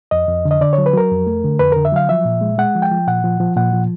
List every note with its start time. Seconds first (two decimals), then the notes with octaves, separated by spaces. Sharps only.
0.11 F2 D#5
0.28 F2
0.45 D3
0.51 D#5
0.61 D3 D5
0.73 C#5
0.78 F#3
0.86 B4
0.93 F#3 A#4
1.11 F2
1.27 A3
1.44 D3
1.59 F2 B4
1.72 D3 A#4
1.85 E5
1.92 F#3 F5
2.09 F3 E5
2.25 A#2
2.41 G#3
2.58 G#3 F#5
2.75 F3
2.82 G5
2.92 F3
3.07 A#2 F#5
3.24 F3
3.40 F3
3.56 A#2 F#5
3.73 F3